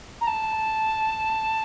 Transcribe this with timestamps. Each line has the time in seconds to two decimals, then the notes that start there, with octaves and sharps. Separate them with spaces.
0.21 A#5
0.27 A5